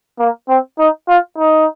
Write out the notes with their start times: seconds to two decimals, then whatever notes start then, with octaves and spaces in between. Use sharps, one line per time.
0.20 A#3
0.49 C4
0.79 D#4
1.09 F4
1.38 D#4